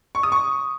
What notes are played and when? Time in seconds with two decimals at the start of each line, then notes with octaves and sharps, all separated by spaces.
0.15 C#6
0.23 D#6
0.32 C#6